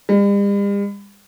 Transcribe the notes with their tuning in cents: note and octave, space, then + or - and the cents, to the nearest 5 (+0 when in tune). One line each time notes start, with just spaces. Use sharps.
G3 +45